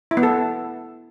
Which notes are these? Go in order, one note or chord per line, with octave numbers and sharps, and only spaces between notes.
E4
B3
A4